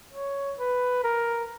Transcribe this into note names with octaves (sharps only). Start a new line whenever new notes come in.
C#5
B4
A#4